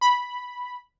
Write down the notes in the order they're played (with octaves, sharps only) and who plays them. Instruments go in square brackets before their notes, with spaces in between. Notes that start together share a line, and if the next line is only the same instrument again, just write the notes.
[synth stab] B5